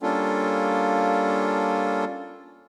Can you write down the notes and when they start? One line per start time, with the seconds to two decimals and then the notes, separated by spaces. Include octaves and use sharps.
0.02 G3 A#3 C#4 D4 F4 A4